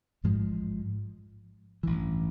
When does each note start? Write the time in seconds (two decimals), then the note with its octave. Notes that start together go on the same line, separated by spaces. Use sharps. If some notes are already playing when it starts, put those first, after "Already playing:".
0.24 A1 G#2 F3 G#3
1.83 A1 G2 E3